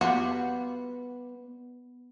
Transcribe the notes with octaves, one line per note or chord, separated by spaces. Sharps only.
G3 B3 F4 F#4